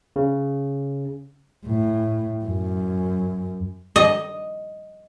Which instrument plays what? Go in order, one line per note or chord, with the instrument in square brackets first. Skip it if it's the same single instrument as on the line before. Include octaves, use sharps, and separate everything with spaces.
[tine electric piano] C#3
[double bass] A2
F#2
[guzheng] D#5